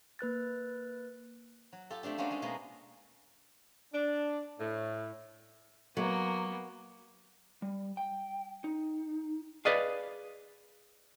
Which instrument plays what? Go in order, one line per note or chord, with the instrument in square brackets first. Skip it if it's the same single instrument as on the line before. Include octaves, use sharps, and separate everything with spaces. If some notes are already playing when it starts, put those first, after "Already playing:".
[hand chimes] A#3 B4 F#6 A6
[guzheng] F#3
F4 G4 A4
A3 C4 D4 G4
A#3 C#4 D4 F4 F#4 C5
G#3 D#4 F4
B2 G#3 A#3
[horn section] D4
A2
[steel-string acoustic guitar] F#3 [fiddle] A#3 B3
[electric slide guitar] G3
G5
D#4
[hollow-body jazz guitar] G#4 B4 D5 D#5 F5